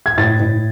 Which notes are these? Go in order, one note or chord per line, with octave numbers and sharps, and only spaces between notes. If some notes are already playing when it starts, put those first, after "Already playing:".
G#6
A2 A6
A2